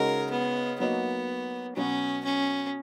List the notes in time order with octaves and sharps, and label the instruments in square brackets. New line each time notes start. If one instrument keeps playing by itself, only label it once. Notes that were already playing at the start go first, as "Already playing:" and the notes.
Already playing: [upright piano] C#3 G#3 D#4 F#4 [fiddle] A#4
[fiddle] B3
[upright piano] F#3 A#3 D#4 F#4 [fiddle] B3
[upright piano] B2 F#3 B3 F#4 [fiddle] C#4
[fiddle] C#4